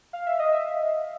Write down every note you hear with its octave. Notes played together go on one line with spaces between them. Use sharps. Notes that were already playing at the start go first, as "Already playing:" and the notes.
F5
E5
D#5
E5